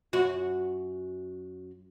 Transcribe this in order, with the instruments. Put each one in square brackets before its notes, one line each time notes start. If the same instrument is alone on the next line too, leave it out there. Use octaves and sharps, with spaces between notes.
[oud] F#2 F#4